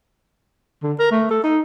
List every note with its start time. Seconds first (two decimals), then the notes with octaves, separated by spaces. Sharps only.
0.83 D3
0.99 A#4
1.11 A3
1.31 A4
1.44 D#4